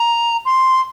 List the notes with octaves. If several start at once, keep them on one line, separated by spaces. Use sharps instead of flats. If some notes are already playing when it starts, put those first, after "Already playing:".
Already playing: A#5
C6